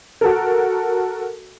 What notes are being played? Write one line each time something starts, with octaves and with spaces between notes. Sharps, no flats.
F#4 A4 A#4